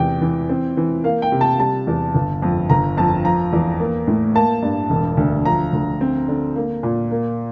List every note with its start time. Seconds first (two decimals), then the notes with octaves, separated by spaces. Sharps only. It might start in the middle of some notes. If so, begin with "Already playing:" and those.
Already playing: E2 C3 G5
0.22 E3
0.49 C4
0.77 E3
1.04 A#3 F5
1.22 G5
1.32 C3
1.41 A5
1.60 G3 A5
1.87 E2
2.15 G1
2.42 F2
2.70 G1 A#5
2.97 F2 A5
3.25 F3 A#5
3.53 E2
3.80 A#3
4.08 A2
4.35 A#3 A5
4.63 G2
4.90 E1
5.17 D2
5.45 F3 A#5
5.73 D2
6.01 C4
6.28 D3
6.56 A#3
6.83 A#2
7.11 A#3